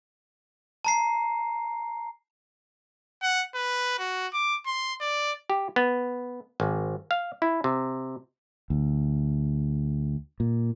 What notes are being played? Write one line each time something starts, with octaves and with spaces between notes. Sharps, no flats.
A5 A#5 C7
F#5
B4
F#4
D6
C6
D5
G4
B3
G#1
F5
E4
C3
D2
A#2